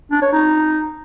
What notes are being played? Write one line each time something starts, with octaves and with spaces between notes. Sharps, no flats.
D4
C#5
D#4